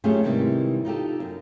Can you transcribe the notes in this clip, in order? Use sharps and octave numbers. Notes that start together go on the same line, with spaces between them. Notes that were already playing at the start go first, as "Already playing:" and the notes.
F#3 A3 C#4 F4 G4 G#4
G#2 C3 D#3 E3 G3
D#4 F4 G4 A4
F#2